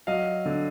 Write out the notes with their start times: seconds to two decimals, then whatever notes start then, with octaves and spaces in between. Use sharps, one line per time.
0.07 F#3 D#5 F5
0.46 D3